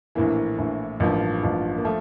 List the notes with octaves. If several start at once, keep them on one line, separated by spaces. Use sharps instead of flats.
A#1 A2 E3 A#3
A#1 A2 E3
A1 G2 F3 A#3
A1 G2 F3
A#3
F3 A3